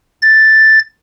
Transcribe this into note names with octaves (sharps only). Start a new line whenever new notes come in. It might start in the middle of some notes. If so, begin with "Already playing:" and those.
A6